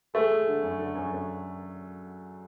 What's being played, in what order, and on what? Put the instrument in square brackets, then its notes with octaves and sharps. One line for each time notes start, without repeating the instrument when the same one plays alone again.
[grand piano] G#3 [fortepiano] A3
[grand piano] G#3
D3
F#2
D3
F#2
F#2